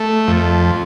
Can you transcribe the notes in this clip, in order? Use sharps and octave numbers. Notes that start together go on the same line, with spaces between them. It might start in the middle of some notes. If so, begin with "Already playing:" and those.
Already playing: A3
F2